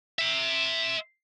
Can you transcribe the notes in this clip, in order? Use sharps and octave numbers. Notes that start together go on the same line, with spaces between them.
E5 C6